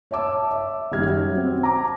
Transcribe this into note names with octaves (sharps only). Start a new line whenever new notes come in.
C#5 E5 A5 D6 E6
E5
F#1 D#3 G3 E5 F6 G#6
F#3
C4
A#5 D6